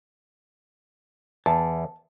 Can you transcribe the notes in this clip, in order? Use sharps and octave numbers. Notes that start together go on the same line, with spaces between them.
E2 A5